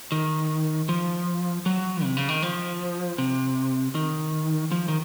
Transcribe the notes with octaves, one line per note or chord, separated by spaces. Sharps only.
D#3
F3
F#3
C3
C#3
D#3
F3
C3
D#3
F3
D#3